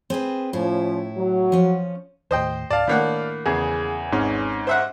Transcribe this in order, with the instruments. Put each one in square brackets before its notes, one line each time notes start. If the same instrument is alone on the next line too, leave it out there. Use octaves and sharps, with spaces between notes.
[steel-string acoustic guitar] C4 G#4 B4
[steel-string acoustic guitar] A2 E4 [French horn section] F3 C#4
[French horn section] F#3
[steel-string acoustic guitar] F3 C#4
[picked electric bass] D#2 A2 [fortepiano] C5 D#5 G5
[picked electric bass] C#2 G#2 [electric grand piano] D5 F5 [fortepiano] A5
[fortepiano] A2 A#3 F#5 [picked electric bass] D#3 D4
[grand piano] E2 C#3 [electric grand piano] G#4
[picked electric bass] G#1 C4 [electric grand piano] G#2 C#4
[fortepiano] C5 E5 F#5